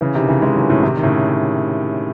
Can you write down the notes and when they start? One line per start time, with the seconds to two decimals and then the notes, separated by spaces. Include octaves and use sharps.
0.01 C#3 E3
0.15 C3 D#3
0.28 C#3 E3
0.42 E3 G#3
0.56 D#3 F#3
0.70 A2 C#3
0.83 C3 D#3
0.97 D#3
1.03 A2 C#3